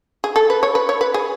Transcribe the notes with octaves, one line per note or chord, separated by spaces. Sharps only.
G#4
A4
B4
C#5
B4
C#5
B4
G#4